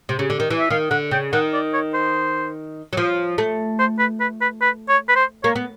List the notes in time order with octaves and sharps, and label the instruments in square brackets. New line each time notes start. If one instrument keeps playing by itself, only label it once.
[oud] C3
C#3
D3
D#3
E3
[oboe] E5
[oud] D#3 [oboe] F5
[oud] D3 [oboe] F#5
[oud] C#3 [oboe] G5
[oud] D#3 [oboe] F#5
[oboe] D5
C#5
C5
[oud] F#3
F3
A3
[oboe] C5
B4
B4
B4
B4
C#5
B4
C5
[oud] A#3 [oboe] C#5
[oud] B3